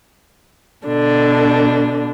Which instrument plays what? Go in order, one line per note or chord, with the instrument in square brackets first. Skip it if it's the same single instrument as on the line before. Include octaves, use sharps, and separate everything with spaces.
[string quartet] B2 D3 D4